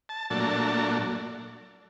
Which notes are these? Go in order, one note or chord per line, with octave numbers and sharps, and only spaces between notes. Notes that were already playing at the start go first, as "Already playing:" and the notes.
A5
A#2 F#3 A3 D4 A5
A#5
A5
A#5
A5
A#5